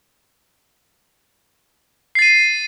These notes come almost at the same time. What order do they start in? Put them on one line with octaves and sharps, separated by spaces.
C7 A6 D#7